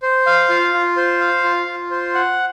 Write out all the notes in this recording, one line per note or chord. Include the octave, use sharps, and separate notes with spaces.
C5
F5
F4
F4
C5
F5
F4
F4
C5
F#5